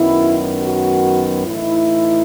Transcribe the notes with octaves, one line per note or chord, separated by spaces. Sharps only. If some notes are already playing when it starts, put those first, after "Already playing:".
Already playing: F#2 D#3 F#3 B3 E4
F#4
A2 E3 A3 D#4 E4